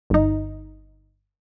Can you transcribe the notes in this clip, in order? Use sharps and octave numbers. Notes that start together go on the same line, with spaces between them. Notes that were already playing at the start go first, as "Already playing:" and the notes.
G1 D#4